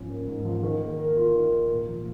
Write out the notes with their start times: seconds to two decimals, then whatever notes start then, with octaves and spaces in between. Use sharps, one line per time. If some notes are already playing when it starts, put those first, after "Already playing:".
Already playing: G#2 F3 C#4
0.09 A#3
0.27 G#2
0.45 F3
0.63 D#3
0.82 A#3
0.99 A#4
1.17 F4
1.35 D#3
1.53 A#3
1.71 A#2
1.89 F3